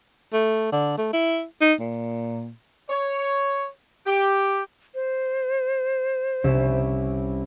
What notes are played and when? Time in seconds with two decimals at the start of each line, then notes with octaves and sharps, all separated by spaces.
0.33 A3
0.72 D3
0.98 A3
1.13 E4
1.61 D#4
1.80 A#2
2.89 C#5
4.06 G4
4.95 C5
6.44 C2 C#4 E5